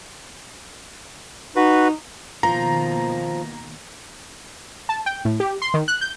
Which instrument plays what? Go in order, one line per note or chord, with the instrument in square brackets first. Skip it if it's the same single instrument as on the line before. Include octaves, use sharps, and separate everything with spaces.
[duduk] D#4 [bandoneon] F#4 B4
[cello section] B2 D#3 A#3 [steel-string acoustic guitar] F3 [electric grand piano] A#5
[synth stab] A5
G5
A2
G4
C6
D#3
F#6
G6